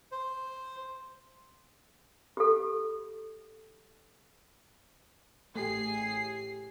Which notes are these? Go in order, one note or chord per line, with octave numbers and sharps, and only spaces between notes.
C5
G4 A4
A1 A3 G4 G#4 C7